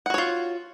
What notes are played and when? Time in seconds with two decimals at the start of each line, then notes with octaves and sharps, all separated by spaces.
0.06 F#5
0.10 F#4
0.14 C#5
0.18 F4